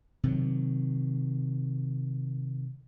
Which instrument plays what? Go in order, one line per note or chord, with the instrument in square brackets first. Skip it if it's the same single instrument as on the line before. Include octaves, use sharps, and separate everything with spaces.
[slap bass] C3 D#3 F#3